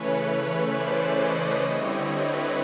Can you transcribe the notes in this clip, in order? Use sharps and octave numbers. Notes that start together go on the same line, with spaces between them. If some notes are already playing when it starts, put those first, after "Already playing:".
Already playing: C#3 E3 A3 C#4 B4 C#5
C5 D5
C#5 D#5
D3 G3 C4 E4
B4 C#5